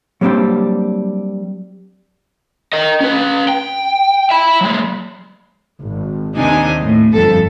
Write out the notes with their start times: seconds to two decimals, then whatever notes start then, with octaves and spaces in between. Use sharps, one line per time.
0.21 F#3 G3 A#3 C4 D4 G4
2.73 A#4 D#5
3.01 C#4 B4
3.49 G5
4.30 E5 B5
4.61 F#3 G#3
5.80 G#1
6.37 D#2 C3 D4 D#4 G#5
6.83 A2
7.13 G1 F2 A4